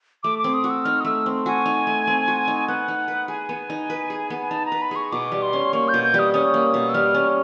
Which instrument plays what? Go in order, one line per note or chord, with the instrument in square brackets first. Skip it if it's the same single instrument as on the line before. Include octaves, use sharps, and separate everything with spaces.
[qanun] A3 [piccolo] D6
[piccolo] D6
[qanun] C4
[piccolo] D#6
[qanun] F#4
[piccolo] E6
[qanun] D#4 [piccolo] F6
[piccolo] D#6
[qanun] A3 [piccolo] E6
[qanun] C4
[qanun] F#4 [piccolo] G#5
[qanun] D#4
A3
C4
F#4
D#4
[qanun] B3 [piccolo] F#5
[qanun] D#4
B4
[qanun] G#4 [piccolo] G#5
[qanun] B3
D#4
B4
G#4
B3
[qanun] D#4 [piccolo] A5
[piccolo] A#5
[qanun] B4
[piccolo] B5
[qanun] G#4 [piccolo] C#6
[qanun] B2 [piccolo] D6
[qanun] G3
[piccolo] C6
[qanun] C#4
[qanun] A#3 [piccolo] C#6
[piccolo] G6
[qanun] B2
[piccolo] G6
[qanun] G3
[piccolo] D#6
[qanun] C#4 [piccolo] D#6
[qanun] A#3
B2
[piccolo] E6
[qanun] G3 [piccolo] F6
[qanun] C#4